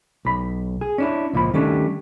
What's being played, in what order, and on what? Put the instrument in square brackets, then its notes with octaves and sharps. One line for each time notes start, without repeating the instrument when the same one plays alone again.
[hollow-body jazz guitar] B1 B5
G#4
C#4 D4 E4
C#2 A#2 F3 B5
D#3 G3 A3 C#4 D4